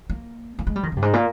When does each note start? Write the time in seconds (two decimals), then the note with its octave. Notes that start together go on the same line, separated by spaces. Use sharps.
0.10 A#3
0.59 A#3
0.67 G#3
0.76 G3
0.83 D#3
0.92 C#3
0.97 G2
1.02 G#2
1.13 A#2